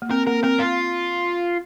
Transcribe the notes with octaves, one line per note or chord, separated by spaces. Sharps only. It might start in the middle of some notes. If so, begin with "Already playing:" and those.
A#3
C4 A#4
A#3 A#4
C4 A#4
F4